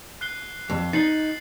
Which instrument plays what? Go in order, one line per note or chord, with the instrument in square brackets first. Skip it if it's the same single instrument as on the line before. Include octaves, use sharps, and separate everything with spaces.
[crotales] F#6 C7 G7
[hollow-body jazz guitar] F2
[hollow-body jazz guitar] D#4 [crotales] A6 C7 F#7